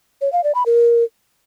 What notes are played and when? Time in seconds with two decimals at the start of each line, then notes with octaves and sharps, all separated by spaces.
0.21 C#5
0.33 F5
0.44 D5
0.55 B5
0.66 A#4